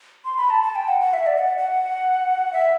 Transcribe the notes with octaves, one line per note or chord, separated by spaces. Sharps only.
C6
B5
A5
A5
G5
F#5
F#5
E5
D5
F#5
F#5
E5